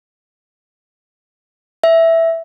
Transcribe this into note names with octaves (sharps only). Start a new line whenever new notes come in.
E5